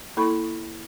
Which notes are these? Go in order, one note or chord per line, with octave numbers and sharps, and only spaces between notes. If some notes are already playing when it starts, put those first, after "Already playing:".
A#3 E4 A4 B5 C#6